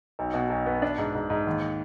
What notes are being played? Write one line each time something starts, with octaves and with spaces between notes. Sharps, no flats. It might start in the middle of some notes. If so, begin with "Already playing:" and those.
B1
B2
B1
B3
D4
G#2
G#2
G#2
D#2